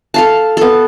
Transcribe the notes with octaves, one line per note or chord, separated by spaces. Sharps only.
A4 F5 A5
B3 A4